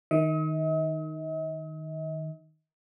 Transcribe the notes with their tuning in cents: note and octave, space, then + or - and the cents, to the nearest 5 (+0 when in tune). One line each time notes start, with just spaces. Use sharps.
D#3 +0 D#5 +45